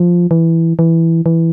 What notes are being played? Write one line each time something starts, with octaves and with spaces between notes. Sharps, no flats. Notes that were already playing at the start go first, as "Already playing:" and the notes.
Already playing: F3
E3
E3
E3